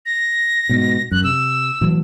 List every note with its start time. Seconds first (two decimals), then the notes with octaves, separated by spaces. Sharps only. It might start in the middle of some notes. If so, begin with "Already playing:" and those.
0.06 A#6
0.69 G#2 B2
1.11 F#2 F#6
1.24 C3 E6
1.81 A2 E3 F#3